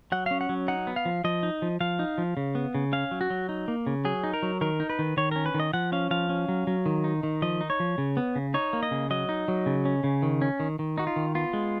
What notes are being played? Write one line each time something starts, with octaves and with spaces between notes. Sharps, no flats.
F#3 F#5
C#4 F5
F#5
F#3
D#4 F#5
B3
F5
F3
F3 D#5
D#4
F3
F3 F5
D#4
F3
C#3
B3
C#3
C#4 F5
F#3
F#4
F#3
D#4
A#3
C#3
F#3 G#4
D#4
A#4
F#3
D#3 A#4
D#4
B4
D#3
D#3 C#5
C#4 A#4
B4
D#3
D#5
F3 F#5
C#4 F5
F3 F5
C#4
F#3
F#3
D#3
D#4
D#3
F3 D#5
D#4
C#5
F3
C#3
B3
C#3
D#4 C#5
A#3
D#5
C#3
F#3 D#5
D#4
F#3
C#3
C#4
C#3
D#3
C#4
D#3
D#3
D#4 F#4
F4
D#3
B3 F4
G#3